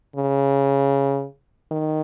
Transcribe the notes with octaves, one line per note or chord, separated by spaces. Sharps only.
C#3
D#3